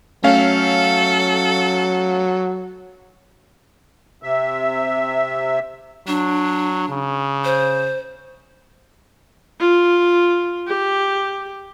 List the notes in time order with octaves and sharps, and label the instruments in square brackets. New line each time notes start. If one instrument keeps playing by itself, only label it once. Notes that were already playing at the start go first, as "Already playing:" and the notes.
[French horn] F#3 [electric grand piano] A3 C#4 F5 [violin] A4
[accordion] C3 E5
[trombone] F#3 [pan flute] D4
[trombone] C#3
[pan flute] C5
[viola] F4
G4